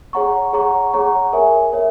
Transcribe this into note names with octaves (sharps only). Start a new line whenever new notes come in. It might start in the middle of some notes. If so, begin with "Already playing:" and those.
G#4 C#5 F#5 A#5 C#6
G#4 C#5 F#5 A#5 C#6
G#4 C#5 F#5 A#5 C#6
A#4 C#5 E5 G#5
A#4 C#5 E5